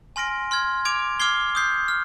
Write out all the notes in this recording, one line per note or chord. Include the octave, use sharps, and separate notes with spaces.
G#5 C6 F6 A#6 D7
C6 F6 G#6
D6 G#6 D7 F7
D6 F6 G#6 C7 G7
D#6 G6 C7
F6